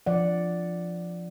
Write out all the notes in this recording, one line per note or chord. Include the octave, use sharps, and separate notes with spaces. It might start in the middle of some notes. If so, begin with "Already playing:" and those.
F3 D5 F#5